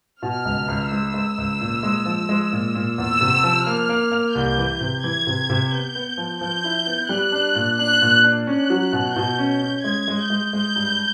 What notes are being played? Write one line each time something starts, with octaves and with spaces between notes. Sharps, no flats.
B2 F6
C#2
C#2
G#3 E6
G#3
C#2
A#2
G#3
F3
G#3
A#2
A#2
E2 E6
C3
F3
A#3 F6
A#3
A#3
C2 G6
E3
C3
E3 G#6
C3
C3
B3 G6
B3
F3
F3 G6
E4
B3
G3 F#6
D4
A#2
D4 F#6
A#2
D4
C#4 F#6
F#3
B2
B2 G6
C#4
G6
C#4
G#3 G#6
G#3
G6
G#3
G#3 G6
G2